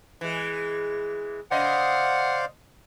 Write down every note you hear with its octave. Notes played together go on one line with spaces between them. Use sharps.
E3 G#3
C#3 C5 D5 D#5 F5 F#5